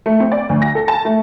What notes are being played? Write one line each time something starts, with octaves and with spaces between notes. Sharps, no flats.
A3
C4
D5
D2
A#6
A4
A5
A3